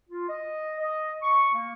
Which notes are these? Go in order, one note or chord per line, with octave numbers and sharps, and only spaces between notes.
F4
D#5
D#5
C#6
A#3